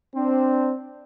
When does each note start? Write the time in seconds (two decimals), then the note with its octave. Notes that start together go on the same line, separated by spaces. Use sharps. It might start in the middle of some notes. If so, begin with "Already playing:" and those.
0.15 C4 D4